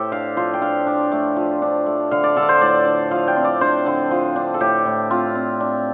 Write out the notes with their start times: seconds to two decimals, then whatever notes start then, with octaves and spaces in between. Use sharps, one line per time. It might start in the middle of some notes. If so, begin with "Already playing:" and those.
Already playing: A2 G4 A4 C5
0.12 D4 F5
0.37 F3 C5
0.54 G5
0.62 D4 F5
0.87 D4
1.12 A3
1.36 F3
1.62 D4
1.86 A3
2.11 D3 F5
2.24 D5
2.36 D3 A4
2.42 D5
2.49 C5
2.61 A2 D5
2.86 D4
3.11 F3 F5
3.27 G5
3.36 C4
3.44 D5
3.61 D4 C5
3.86 D3
4.11 F3
4.36 D4
4.54 A4
4.60 A2 G4
4.86 A2
5.10 C4 F4
5.35 C4
5.60 D4